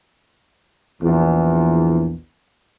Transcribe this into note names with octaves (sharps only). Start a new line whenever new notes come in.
A#1 E2